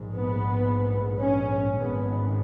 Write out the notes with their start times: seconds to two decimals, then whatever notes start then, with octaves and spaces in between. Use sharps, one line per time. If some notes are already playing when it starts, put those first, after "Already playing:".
Already playing: A#1 G#2
0.14 B3
1.23 C#4
1.77 G#1 G#2 B3